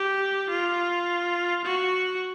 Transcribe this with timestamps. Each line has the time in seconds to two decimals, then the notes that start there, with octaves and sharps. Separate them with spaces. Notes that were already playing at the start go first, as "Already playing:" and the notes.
Already playing: G4
0.50 F4
1.65 F#4